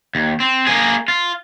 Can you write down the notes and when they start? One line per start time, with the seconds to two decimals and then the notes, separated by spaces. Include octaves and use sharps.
0.15 D#2
0.40 C4
0.67 A#3 G#4
1.08 F4